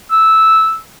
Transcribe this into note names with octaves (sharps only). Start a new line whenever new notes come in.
E6